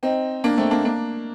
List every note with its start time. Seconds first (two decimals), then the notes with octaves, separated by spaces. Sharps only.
0.03 C4 D#4
0.44 A#3 D4
0.57 A3 C4
0.71 A#3 D4
0.85 A#3 D4